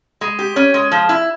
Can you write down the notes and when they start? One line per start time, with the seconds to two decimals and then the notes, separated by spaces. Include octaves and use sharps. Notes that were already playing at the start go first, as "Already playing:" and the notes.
0.21 G#3
0.39 G4
0.56 C#4
0.74 G#3
0.91 F3
1.09 E4